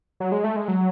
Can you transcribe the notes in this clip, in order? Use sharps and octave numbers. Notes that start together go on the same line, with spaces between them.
F#3
G#3
A3
G#3
F#3